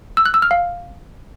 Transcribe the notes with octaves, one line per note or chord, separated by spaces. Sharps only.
E6
F#6
E6
F6
F5